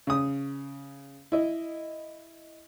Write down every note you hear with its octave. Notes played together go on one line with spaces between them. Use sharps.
C#3 D#6
E4 D#5